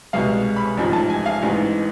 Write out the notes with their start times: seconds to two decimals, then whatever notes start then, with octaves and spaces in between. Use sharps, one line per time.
0.13 C2 B2 G#3 F5
0.56 B5
0.77 A1 G#2 F3
0.93 A5
1.10 G#5
1.26 F5
1.42 A1 G#2 E3